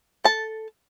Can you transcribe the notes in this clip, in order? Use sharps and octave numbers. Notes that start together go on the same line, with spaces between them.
A4 A5